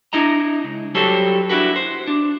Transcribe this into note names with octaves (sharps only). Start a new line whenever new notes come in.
D4 E4 D#5 A#5
C#2
F#3 G3 A4 C5 C#5
D4 E4 F#4 B4
C5
D4